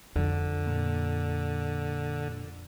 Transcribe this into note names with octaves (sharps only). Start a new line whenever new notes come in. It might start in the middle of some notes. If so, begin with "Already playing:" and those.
F2 D3
A#2